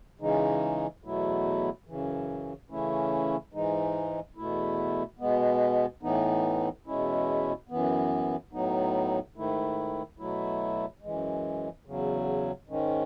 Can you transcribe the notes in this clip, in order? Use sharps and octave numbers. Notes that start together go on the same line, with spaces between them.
C#3 E3 G#3 D#4
E2 B2 F#3 A3 E4
F#2 C#3 E3
C#3 E3 A3 C#4 E4
G#2 E3 G#3 D#4
E2 B2 A3 E4
B2 G#3 B3
A2 E3 B3 D#4
E2 B2 G#3 C#4 E4
F#2 E3 B3
A2 F#3 B3 D#4
G#2 D#3 A3 E4
B2 F#3 A3 E4
F#2 E3 G#3
E2 C#3 F#3
G#2 D#3 G#3 C#4